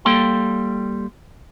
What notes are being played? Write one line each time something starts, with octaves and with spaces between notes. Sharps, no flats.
G3 A#3 A4 G5 C6